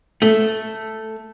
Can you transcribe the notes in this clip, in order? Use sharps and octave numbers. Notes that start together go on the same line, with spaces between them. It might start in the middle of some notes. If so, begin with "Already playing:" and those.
A3